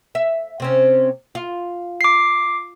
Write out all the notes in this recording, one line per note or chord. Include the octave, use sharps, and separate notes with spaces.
E5
C3 C4 C#4
F4
D6 C7